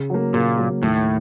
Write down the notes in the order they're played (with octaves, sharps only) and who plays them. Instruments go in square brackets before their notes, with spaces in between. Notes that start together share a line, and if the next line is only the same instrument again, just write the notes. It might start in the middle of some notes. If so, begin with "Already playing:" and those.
Already playing: [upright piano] C#3
F#3 A#3
[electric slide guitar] A#2 [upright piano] C#3
[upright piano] F#3 A#3
[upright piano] D#2 [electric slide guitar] A2